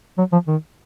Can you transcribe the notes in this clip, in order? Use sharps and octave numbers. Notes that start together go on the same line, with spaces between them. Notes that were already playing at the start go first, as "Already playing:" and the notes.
F#3
F3
D#3